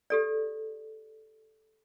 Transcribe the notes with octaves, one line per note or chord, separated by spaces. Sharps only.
G4 A4 D5